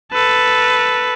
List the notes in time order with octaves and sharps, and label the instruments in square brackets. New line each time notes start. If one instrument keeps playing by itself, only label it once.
[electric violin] A4 B4